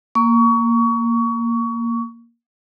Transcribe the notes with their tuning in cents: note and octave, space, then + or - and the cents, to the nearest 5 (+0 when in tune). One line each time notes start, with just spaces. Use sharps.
A#3 +0 C#6 +25